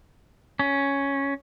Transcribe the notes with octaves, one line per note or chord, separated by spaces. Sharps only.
C#4